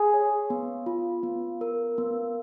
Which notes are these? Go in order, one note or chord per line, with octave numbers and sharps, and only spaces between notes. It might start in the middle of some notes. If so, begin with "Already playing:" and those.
Already playing: G#4 G#5
C#5
B3
F4
B3
A#4
B3